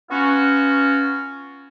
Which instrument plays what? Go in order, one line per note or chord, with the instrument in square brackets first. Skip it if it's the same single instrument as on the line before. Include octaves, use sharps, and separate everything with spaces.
[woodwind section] B3 C#4 F4 F#4